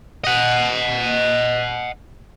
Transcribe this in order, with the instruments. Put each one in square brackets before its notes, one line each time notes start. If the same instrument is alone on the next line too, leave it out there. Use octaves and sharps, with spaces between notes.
[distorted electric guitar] D#5 F#5